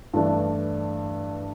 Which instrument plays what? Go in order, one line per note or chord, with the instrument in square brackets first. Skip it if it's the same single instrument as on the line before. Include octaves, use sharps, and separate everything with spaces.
[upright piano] G2 E3 A3 D4